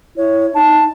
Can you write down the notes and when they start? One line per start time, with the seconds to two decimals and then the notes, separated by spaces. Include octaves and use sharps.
0.17 E4 C#5
0.55 D#4 A5